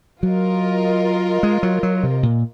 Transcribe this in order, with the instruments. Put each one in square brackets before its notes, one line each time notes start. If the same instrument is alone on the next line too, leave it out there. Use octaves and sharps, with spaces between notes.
[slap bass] F#3 [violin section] F4 A#4 D#5
[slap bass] G#3
F#3
F#3
C3
A#2